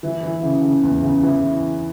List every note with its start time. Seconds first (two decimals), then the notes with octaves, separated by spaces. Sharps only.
0.03 E3
0.23 E3
0.43 C#3
0.62 C#3
0.83 E2
1.03 C#3
1.23 E3